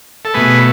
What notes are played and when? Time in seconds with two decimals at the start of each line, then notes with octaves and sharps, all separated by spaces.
0.25 A4
0.34 B2 A3 G#4 B4